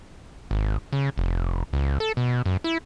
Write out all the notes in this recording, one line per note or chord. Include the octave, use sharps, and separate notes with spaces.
G#1
C#3
F1
C#2
A4
B2
F#2
E4